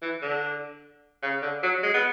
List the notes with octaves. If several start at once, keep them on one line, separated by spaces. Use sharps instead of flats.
E3
D3
C#3
D3
F#3
G#3
B3